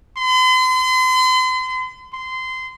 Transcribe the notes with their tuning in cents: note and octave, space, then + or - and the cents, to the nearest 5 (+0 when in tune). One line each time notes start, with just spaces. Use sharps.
C6 -40
C6 -20